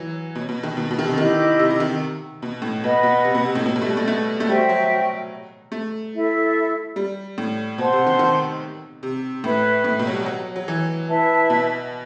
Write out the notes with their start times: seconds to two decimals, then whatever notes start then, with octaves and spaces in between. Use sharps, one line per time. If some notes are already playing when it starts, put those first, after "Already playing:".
Already playing: E3 F#3
0.35 B2
0.49 B2
0.63 D#3
0.77 B2
0.91 B2
0.99 D#3
1.05 C3
1.18 D#3 E4 G4 D#5
1.59 C3
1.70 C3
1.80 D#3
2.42 B2
2.62 A2
2.83 B2 B4 D#5 F#5 B5
3.03 B2
3.24 C3
3.35 B2
3.45 C3
3.55 A2
3.66 B2
3.76 B2
3.82 A3
3.86 G3
3.97 A3
4.08 A3
4.40 A3
4.48 G3 F#4 C5 E5 G5
4.69 F#3
5.72 A3
6.13 E4 A4 E5
6.96 G3
7.38 A2
7.78 B2 C5 F#5 A5 C6
7.92 C3
8.07 D#3
8.19 D#3
9.03 C3
9.43 A2 B4 E5 B5
9.84 A2
9.99 B2
10.07 F#3
10.13 G3
10.26 F#3
10.56 F#3
10.68 E3
11.08 E4 B4 E5 A5
11.50 B2